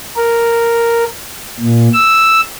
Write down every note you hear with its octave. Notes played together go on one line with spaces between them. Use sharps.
A#4
A#2
E6